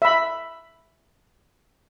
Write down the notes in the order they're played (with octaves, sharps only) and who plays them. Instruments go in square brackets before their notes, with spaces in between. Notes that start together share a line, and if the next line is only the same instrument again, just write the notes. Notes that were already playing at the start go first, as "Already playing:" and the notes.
[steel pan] E5 B5